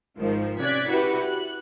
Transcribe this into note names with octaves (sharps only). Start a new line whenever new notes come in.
G#1 G#2 D#3 F3
C3 C#4 D5 F#6 G#6 B6
E4 F#4 G4 B4
F#6